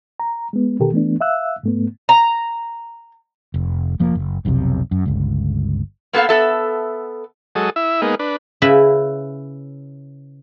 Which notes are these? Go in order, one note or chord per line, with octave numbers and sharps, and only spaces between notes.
A#5
G#3 B3
B2 D#3 G4 A4 A#4
E3 A3 B3 D4
E5 F5 E6 F#6
G#2 A3 B3
A#5
F1
F1 F3 A#3
F#1
F1 B1 F2 C3
F#2
G1 C#2
A#3 B3 A4 B4 F5
B3 A4 E5
F#3 G#3 A4 D#5
E4 E5
G#3 A#3 B3 D#4
D4 B4
C#3 E4 B4 E5 B5